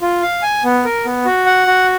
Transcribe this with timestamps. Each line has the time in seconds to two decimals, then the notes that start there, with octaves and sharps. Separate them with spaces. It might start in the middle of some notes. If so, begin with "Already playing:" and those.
0.02 F4
0.22 F5
0.42 G#5
0.64 B3
0.85 A#4
1.05 B3
1.25 F#4
1.46 F#5
1.67 F#4